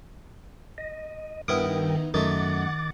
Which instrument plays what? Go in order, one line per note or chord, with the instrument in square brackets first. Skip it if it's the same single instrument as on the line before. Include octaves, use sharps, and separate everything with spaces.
[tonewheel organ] D#5
[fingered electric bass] G2 [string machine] D#3 D#4 [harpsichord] B3 E4 D#6 [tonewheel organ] A#4 G5
[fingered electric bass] F#2 [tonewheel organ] D#3 D6 A6 [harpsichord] A3 D#4 [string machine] F#5